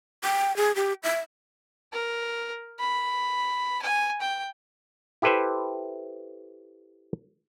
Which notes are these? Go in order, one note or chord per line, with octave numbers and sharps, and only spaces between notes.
G5
G#4
G4
E5
A#4
B5
G#5
G5
E4 G4 A4 B4 C5 E5